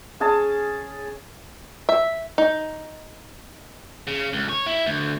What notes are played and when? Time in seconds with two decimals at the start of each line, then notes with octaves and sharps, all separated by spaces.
0.20 C#4 G#4 A5
1.89 E5
2.38 D#4
4.07 C#3
4.33 C#2
4.49 C#5
4.66 E4
4.86 D2